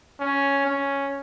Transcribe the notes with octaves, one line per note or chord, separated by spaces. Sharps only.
C#4
C#4